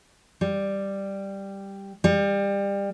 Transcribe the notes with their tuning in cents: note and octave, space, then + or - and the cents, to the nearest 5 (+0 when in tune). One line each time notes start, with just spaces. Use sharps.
G3 +5
G3 +25